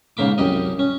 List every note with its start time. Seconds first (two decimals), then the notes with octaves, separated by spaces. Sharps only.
0.17 G#2 C#3 A#3 B5 D6
0.38 C2 F#2 G4 D#5
0.79 C#4